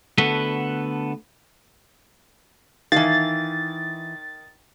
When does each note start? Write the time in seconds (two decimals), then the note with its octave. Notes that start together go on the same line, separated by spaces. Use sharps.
0.18 D3 A3 B3 F#4 A4 B4
2.92 D#3 E3 F5 A6